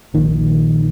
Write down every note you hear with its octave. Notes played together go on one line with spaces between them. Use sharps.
A#1 A#2 D#3